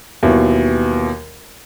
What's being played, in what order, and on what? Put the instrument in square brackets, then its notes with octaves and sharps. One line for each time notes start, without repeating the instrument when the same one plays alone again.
[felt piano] D#2 B2 E3 F#3